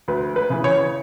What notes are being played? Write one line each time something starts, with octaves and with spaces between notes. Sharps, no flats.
D2 B4
B4
C#3 E3
C#5